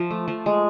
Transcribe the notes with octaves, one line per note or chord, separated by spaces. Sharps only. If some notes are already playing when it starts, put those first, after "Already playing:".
Already playing: F3 E5
A3
F3
G#3